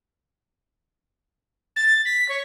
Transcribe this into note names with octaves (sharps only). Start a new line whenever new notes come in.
A6
B6
C#5